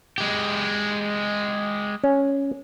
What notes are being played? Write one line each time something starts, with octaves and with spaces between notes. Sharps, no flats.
G#3 G4
C#4